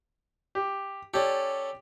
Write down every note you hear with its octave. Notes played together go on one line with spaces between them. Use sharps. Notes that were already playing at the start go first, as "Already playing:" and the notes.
G4
C#4 G4 A4 D5